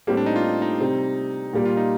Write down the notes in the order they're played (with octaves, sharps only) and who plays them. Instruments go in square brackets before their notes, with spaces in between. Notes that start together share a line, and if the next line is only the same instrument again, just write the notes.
[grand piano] A2 G3 C4 G4 [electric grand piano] A#3
[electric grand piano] D4
D#4
F4
D#4
D#4
[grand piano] C3 G3 C4
A#2 G3 A#3
[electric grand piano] F4
D#4